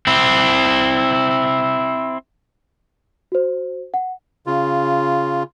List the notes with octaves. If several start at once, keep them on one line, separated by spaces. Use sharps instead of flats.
C4 E4
F#4 C5
F#5
C#3 F4